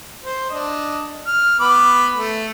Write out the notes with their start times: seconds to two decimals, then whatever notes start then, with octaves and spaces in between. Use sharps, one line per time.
0.23 C5
0.50 D4 D#5
1.27 F6
1.60 B3 B5 D6
2.15 A3